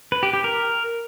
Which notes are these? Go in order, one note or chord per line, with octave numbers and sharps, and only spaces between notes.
B4
G4
G4
A#4